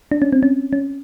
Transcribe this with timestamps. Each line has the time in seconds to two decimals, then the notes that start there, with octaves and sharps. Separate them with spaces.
0.11 D4
0.22 C#4
0.33 C4
0.43 C#4
0.73 C#4